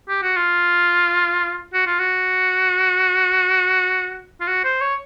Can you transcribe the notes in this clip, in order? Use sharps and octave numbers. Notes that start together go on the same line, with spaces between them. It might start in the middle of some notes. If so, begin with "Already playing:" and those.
G4
F#4
F4
F#4
F4
F#4
F4
F#4
C5
C#5